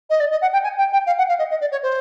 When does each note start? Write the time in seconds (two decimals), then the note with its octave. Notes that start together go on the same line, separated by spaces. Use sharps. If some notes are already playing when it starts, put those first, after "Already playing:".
0.09 D#5
0.20 D5
0.31 D#5
0.41 F#5
0.52 G5
0.63 G#5
0.77 G5
0.92 G5
1.06 F5
1.17 F#5
1.28 F5
1.38 D#5
1.50 D#5
1.60 D5
1.71 C#5
1.82 C5